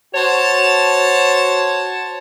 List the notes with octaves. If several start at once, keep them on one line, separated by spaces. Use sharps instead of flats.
F#4 C5 C#5 A5